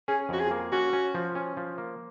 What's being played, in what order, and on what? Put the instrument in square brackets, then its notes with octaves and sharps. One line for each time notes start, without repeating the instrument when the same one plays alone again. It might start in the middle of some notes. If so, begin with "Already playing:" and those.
[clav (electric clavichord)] C#4 [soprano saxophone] G#4
[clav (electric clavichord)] F2 [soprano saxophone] F#4
[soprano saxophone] G#4
[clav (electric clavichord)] A#3
[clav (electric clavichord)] C#4 [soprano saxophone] F#4
[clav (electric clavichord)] C#4
F3
C#4
F3
A#3